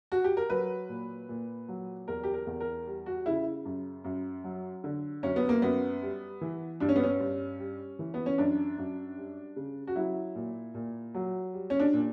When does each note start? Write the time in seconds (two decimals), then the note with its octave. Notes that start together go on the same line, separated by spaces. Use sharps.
0.12 F#4
0.24 G4
0.37 A#4
0.50 F#3 B4
0.89 A#2
1.29 A#2
1.68 F#3
2.08 E2 A#4
2.24 G4
2.34 A#4
2.47 E2
2.60 A#4
2.87 G3
3.06 F#4
3.26 C#3 E4
3.65 F#2
4.04 F#2
4.44 F#3
4.84 D3
5.23 F#2 C#4
5.36 B3
5.49 A#3
5.62 F#2 B3
6.02 G3
6.41 E3
6.80 G2 D4
6.89 C#4
6.96 B3
7.03 C#4
7.20 G2
7.59 G3
7.99 E3
8.14 B3
8.26 C#4
8.38 F#2 D4
8.78 F#2
9.17 G3
9.56 C#3
9.87 F#4
9.96 F#3 E4
10.35 A#2
10.74 A#2
11.14 F#3
11.54 G3
11.70 C#4
11.80 D4
11.93 A#2